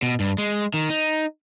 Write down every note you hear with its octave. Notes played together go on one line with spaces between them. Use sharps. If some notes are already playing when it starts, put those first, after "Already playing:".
B2
G2
G#3
D#3
D#4